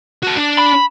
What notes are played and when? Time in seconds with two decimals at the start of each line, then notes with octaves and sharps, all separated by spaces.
0.23 F#4 A4
0.36 D4 D5
0.58 B5